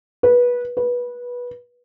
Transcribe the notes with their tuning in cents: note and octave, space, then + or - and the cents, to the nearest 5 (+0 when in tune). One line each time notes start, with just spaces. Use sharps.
B4 -20
B4 -20